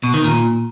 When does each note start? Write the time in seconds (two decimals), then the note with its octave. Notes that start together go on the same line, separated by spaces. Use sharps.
0.03 B2
0.14 D#3
0.24 A#2